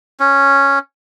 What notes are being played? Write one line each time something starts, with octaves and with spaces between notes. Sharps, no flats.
C#4